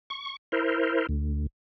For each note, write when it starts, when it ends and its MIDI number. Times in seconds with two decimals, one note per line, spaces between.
0.10 0.36 85
0.52 1.07 64
0.52 1.07 70
0.52 1.07 72
1.09 1.47 38